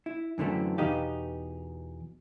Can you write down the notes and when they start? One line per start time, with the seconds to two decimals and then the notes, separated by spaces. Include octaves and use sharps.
0.06 E4
0.38 F#2 D3 E3 A3 C4
0.78 E2 B2 B3 D#4 G4 F5